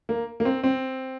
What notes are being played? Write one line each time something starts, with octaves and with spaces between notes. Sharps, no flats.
A#3
A#3
C4
C4